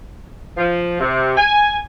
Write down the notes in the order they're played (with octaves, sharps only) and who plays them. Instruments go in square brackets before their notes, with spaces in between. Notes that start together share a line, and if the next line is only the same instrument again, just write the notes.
[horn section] F3
C3
G#5